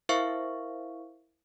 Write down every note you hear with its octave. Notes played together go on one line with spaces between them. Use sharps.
E4 A#4 C5 E5 F5 C#6